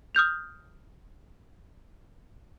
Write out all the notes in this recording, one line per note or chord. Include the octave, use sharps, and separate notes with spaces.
D#6 F6 G6 F7